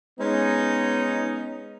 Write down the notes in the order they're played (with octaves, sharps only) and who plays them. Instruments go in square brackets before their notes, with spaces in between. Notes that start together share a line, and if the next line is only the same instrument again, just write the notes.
[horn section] G#3 B3 C#4 D#4